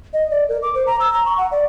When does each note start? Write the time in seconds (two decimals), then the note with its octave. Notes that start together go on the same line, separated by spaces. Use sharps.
0.13 D#5
0.31 D5
0.49 A#4
0.62 D6
0.75 C5
0.87 A#5
1.00 E6
1.13 A#5
1.26 C#6
1.38 F#5
1.52 D5